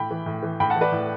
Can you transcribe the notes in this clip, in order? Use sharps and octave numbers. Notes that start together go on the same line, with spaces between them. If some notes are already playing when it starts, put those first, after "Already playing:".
Already playing: A2 G5 B5
E3
A2
E3
A2 G5 B5
F#5 A5
E3
B4 D5
A2